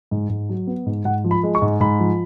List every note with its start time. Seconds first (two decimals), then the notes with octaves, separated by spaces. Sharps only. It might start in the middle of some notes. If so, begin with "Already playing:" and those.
0.11 G#2
0.29 G#2
0.49 F#3
0.67 B3
0.86 G#2
1.05 G#2 F#5
1.24 F3
1.31 B5
1.43 G#3
1.55 C#6
1.62 G#2
1.80 G#2 B5
2.00 F3